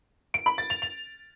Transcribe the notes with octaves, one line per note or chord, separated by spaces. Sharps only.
D7
B5
A6
F7
F7